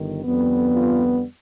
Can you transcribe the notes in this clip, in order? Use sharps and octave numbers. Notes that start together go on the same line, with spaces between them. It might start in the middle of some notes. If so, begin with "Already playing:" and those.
Already playing: G1 D#3
F2 D3 G3 B3
F4